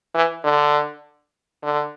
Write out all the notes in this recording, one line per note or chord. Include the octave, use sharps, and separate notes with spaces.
E3
D3
D3